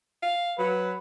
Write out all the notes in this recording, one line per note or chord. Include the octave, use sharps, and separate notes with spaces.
F5
F#3 B4